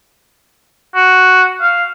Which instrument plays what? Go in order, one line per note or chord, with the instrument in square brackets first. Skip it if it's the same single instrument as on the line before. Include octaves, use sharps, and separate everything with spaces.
[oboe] F#4
F5